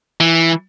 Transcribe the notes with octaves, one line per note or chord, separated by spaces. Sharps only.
E3